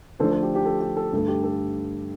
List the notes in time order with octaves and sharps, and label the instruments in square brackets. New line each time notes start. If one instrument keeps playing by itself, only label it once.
[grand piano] D3 F3 A3 D4 A4 C5
A4
G4
G4
A4
G4
A4
G2 D3 A3 A4
G4
A4